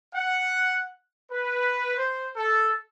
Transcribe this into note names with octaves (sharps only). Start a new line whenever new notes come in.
F#5
B4
C5
A4